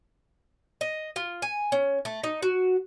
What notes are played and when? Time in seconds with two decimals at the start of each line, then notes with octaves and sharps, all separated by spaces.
0.81 D#5
1.16 F4
1.42 G#5
1.72 C#4
2.05 A3
2.24 D#4
2.42 F#4